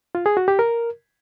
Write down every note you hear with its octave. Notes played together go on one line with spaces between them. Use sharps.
F4
G#4
F#4
G4
A#4